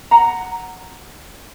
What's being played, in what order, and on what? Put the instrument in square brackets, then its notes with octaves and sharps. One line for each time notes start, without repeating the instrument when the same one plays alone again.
[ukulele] F#5 A#5